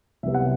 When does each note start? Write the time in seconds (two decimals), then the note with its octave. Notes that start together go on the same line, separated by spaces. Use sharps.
0.23 C2 C3 F#3 B3 E5
0.34 F#5